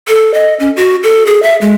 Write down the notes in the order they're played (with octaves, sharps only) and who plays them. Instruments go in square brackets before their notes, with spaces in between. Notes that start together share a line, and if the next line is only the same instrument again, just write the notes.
[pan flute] A4
D#5
C#4
F#4
A4
G#4
E5
G#3